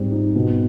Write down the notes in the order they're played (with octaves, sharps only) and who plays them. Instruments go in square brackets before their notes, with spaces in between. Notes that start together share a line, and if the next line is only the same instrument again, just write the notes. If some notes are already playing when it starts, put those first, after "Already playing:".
Already playing: [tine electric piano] G#2 [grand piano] G3 C4
[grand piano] D#4
B2